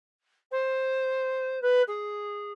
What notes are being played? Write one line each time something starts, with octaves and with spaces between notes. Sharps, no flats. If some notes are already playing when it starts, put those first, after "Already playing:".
C5
B4
G#4